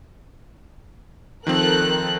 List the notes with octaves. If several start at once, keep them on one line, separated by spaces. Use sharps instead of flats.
D#3 F3 C4 A4 A#4 F#6